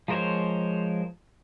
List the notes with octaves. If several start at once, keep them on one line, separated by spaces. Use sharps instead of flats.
F3 G#3 A#4 C5 C#5